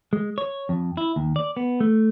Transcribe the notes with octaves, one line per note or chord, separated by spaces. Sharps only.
G#3
C#5
F2
E4
D#2
D5
B3
A3